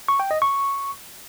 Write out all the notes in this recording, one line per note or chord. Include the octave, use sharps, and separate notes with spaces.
C#6
G5
D#5
C#6